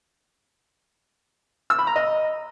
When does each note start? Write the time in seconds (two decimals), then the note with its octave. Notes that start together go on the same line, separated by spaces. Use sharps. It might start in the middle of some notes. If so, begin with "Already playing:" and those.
1.70 E6
1.79 B5
1.87 A#5
1.96 D#5